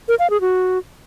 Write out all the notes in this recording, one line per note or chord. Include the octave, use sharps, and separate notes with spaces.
A#4
F5
G#4
F#4